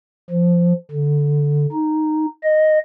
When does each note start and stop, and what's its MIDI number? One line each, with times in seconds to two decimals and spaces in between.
0.30 0.73 53
0.91 1.66 50
1.72 2.26 63
2.43 2.78 75